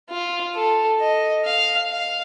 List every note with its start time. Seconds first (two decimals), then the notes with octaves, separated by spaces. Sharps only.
0.10 F4
0.55 A4
1.00 D#5
1.45 F5
1.91 F5